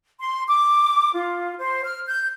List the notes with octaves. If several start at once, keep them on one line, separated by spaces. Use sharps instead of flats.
C6
D6
F4
C5
F6
G6